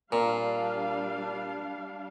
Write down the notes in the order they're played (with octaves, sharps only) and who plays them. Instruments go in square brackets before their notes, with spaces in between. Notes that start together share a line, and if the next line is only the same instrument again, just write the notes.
[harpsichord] A#2 [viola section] G3 D4 F5